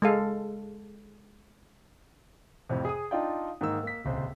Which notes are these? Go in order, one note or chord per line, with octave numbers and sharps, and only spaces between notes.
G#3 A4 F5
F2 A2 C3
G#4 D#6
D4 D#4 F4 D5 G5
G#2 D#3 A#3 E6
A#3 B6
D#1 C#2 C3 C5